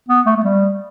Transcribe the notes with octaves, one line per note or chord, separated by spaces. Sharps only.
B3
A3
A3
G3